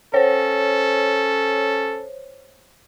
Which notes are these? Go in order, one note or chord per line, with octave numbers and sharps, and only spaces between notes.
C#4 A4 C5 C#5